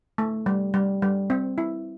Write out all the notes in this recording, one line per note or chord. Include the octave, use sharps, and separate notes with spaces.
A3
G3
G3
G3
C4
E4